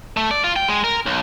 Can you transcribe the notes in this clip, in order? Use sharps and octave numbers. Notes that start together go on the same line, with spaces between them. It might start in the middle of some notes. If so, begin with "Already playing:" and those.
A3
D5
F4
G5
G#3
A#4
B1